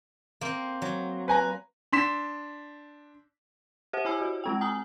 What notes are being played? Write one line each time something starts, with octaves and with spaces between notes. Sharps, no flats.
A#3 C4
F#3
B4 G#5 A#5
D4 C6 B6 E7
G4 C5 F#5
E4 G#5 B5 E6
F#4
G#3 C4 G5
G#5 A#5 D#6